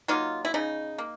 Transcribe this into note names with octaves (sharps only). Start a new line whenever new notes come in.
F#3 A#3 D#4 F4
E4
C#3 D#4
A#3